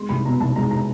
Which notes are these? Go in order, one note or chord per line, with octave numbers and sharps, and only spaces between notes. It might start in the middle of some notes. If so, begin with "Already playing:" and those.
Already playing: G#3 C6
C2 B5
B2 A#5
C2 A5
G#3 A#5
A#5